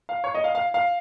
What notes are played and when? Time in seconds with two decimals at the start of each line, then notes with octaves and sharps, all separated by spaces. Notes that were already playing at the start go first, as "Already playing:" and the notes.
0.09 F5
0.24 C#5
0.35 D#5
0.44 F5
0.55 F5
0.74 F5